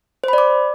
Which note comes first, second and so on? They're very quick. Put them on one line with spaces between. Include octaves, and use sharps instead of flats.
C5 B5 D5 D6